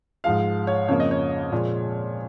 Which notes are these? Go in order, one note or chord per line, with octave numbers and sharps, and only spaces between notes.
G#2 F3 G#3 F5
C#5
F2 C#3 F3 A#3 C#5
D#5
C#5
A#2 F3 G#3